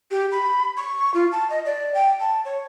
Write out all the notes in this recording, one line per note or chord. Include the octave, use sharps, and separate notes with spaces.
G4
B5
C#6
F4
A5
D#5
D5
G5
A5
C#5